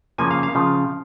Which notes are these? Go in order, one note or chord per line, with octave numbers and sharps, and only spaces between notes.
C#3 F3 A#3 C#4 G#5
F5
F5
C#3 F3